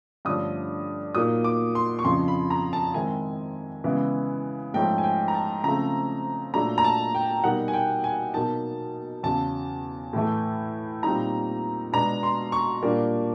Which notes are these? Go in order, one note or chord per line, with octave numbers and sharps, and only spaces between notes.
G2 D3 F3 A3 C#4 D#6
A#2 F#3 A#3 D#4 D#6
D6
C6
C#6
F2 C#3 F3 C6
B5
A#5
A5
D#3 G#3 C4 E4 G#5
C#3 E3 G#3 B3 E4
G#2 F3 A3 C#4 G5
G#5
G5
A#5
A5
C#3 F3 A3 C4 A#5
A#2 F#3 A3 D4 A#5
A#5
A5
G5
B2 G3 A#3 D#4 F#5
G#5
G5
G#5
B2 F#3 A#3 D#4 A5
E2 C#3 F#3 A5
A2 E3 A3
A#2 G3 C4 D#4 A#5
B2 G#3 B3 D4 A#5
C6
C#6
A#2 G3 A#3 D4